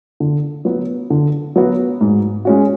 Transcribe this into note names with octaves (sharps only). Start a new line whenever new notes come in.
D3
F#3 B3 F#4
D3
F#3 B3 F#4
G#2
G#3 C#4 F#4